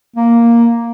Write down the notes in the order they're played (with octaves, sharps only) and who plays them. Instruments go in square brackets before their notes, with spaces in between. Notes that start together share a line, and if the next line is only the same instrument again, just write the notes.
[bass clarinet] A#3